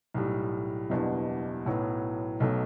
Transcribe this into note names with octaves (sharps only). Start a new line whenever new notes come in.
B1 A2 G3
F#1 E2 B2 G3 D4
B1 A2 F#3 B3
B1 B2 F#3 A3